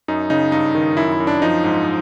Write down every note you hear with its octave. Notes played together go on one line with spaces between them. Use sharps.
F#2 D#4
C#3 D#4
G2 D#4
D#3
F#2 E4
E4
F#2
D4
F3 D#4
G#2